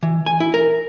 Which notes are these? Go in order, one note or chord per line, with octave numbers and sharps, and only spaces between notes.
E3
G#5
E4
A#4